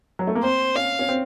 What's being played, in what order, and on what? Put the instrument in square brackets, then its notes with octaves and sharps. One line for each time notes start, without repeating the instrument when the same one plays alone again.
[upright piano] F#3
A3
A#3
[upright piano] C4 [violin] C5
[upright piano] C#4 [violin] F5
[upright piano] C#4
C4